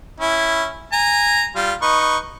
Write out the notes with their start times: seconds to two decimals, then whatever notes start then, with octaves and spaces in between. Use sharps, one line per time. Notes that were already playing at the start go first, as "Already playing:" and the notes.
0.20 C#4 E4
0.92 G#5 A#5
1.56 G3 F4
1.82 D#4 B4 C#6